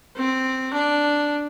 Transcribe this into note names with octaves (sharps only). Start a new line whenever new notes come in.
C4
D4